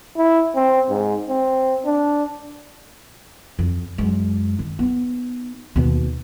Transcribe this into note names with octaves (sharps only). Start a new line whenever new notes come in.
E4
C4
G#2
C4
D4
F2
F#2 G#3
D#3
B3 D#4
D#2 B2